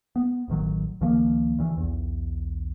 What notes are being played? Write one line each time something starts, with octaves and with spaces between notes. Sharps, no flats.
B3
D1 A1 D#3 F#3
C#2 D#3 F3 A#3
D2 E3
B1 E2